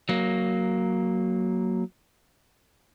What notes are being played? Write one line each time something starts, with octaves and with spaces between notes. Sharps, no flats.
F#3 A#3